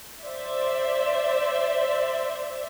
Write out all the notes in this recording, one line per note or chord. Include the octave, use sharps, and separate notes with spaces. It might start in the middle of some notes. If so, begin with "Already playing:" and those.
C5 D5 E5